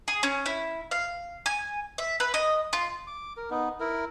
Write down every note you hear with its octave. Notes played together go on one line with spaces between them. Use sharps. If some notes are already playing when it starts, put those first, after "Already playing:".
G#4
C#4
E4
F5
G#5
E5
B4
D#5
F4
D6
A#4
B3 D#4
E4 A#4